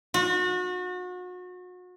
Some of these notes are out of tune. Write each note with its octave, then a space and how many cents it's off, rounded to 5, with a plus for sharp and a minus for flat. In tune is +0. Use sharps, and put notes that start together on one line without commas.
F#4 -35